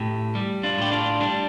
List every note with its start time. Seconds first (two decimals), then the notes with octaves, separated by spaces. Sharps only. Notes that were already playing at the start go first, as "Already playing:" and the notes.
Already playing: A2 G4
0.35 G3
0.63 D4 F4
0.78 A2 G4
0.92 D4 F4
1.20 G3 D4